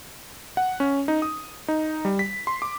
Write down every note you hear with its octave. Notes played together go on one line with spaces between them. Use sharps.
F#5
C#4
D#4
D#6
D#4
G3
B6
C6
D6